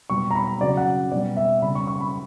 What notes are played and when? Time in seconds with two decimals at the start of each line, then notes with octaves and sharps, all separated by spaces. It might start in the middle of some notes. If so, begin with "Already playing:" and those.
0.10 B2 G3 C#6
0.31 A#5
0.35 B5
0.61 C#3 F#3 D5
0.77 F#5
1.12 B2 G3 D5
1.37 E5
1.62 C#3 G3 B5
1.75 C#6
1.87 C#6
2.01 B5